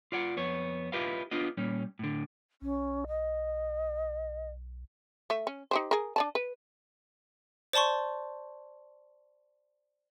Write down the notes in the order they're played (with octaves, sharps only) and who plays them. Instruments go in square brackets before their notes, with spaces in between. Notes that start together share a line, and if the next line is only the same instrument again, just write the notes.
[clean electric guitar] F4 D5 F#5
F2 B3 C#5
E4 F4 G4 B4 D#5 F5
B3 D4 F4 D#5
A#2 G3 C#4
A2 D3
[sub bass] B1 [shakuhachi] C#4
[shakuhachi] D#5
[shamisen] A3 E5
C#4
D#4 G4 C5
G#4 A#4
D4 D5 A5
B4
[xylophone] C5 D5 A5 C6 C#6